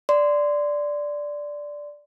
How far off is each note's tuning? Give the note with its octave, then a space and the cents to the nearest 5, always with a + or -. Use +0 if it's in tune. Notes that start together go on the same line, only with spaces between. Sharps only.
D5 -5 C6 -20